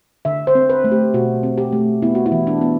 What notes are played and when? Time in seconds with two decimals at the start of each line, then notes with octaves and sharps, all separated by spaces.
0.25 D3 E5
0.47 C5
0.55 C4
0.70 B4
0.84 A3
0.91 G4
1.14 B2 F#4
1.43 C4
1.58 G4
1.72 A3
2.02 B3 E4
2.15 F#4
2.26 E4
2.32 E3
2.47 D4
2.61 B3